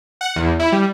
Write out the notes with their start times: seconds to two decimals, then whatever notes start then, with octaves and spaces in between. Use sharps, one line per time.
0.21 F#5
0.36 E2
0.60 E4
0.72 G3